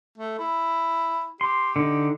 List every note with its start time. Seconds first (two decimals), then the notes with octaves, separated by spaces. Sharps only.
0.18 A3
0.39 E4
1.41 G4 C6
1.76 D3 D#4